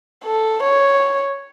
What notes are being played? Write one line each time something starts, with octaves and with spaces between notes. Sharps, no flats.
A4
C#5